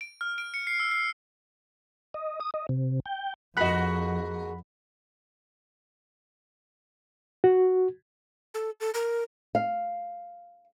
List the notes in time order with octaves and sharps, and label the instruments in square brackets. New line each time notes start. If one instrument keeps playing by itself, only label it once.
[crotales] D7
F6
D7
C#7
C7
E6
C7
[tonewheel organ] D#5
D#6
D#5
C3
G5
[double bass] F2 [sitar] G#2 A#3 F#4 [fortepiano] D#5 F#6 [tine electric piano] F#5 B5
[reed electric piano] F#4
[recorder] A4
A4
A#4
[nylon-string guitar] F5